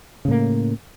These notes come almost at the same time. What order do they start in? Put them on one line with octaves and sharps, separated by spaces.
C#3 A2 A#3